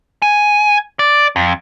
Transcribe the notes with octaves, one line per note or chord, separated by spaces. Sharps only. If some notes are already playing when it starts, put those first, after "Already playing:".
G#5
D5
F2